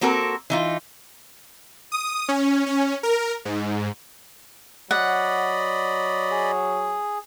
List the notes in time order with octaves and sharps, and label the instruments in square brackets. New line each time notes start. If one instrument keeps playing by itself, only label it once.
[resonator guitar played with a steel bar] A#3 C4 F#4 A4 A#4
E3 D#4 F4
[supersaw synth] D#6
C#4
C#4
A#4
G#2
[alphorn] F#3 [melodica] D5 D#5 B5 [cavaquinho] F#5
[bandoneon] G#4